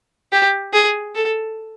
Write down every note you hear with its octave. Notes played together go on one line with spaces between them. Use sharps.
G4
G#4
A4